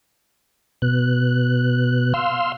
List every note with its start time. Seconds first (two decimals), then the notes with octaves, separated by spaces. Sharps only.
0.82 B2 F#6
2.14 F5 C6 E6